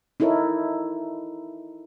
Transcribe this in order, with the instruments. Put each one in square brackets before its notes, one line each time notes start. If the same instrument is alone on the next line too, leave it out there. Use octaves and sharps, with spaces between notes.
[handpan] D#4 E4 A4 A#4 C#5